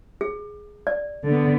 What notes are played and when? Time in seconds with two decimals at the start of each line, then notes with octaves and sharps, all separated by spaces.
0.21 G#4
0.87 D5
1.26 D3 B3